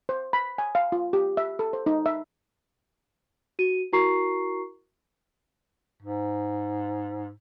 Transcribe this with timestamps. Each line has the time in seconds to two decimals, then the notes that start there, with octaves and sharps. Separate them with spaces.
0.09 C5
0.33 B5
0.58 G#5
0.75 F5
0.92 F4
1.13 G4
1.37 E5
1.59 A4
1.73 C5
1.86 D#4
2.06 E5
3.59 F#4 D#7
3.93 E4 F#4 A#4 A#5 C#6 C7
6.02 G#2